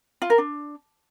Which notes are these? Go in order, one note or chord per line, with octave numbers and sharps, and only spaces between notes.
F4
A#4
D4